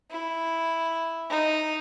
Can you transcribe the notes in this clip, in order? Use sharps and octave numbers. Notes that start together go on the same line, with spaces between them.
E4
D#4